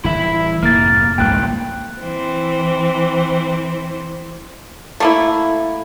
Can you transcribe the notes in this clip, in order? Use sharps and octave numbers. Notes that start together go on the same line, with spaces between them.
D1 E3 G3 E4 E5
F1 F2 G#2 A#3 F6 A6
G#1 C#2 G2 A#2 G#3 G5 F#6
E3 C4
A3 A#3 E4